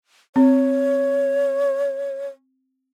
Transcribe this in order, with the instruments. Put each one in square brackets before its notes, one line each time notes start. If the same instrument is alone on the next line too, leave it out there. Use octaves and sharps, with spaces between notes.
[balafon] C4 [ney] C#5